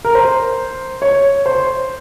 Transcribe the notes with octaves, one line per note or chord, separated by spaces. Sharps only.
A#4
C5
C#5
C5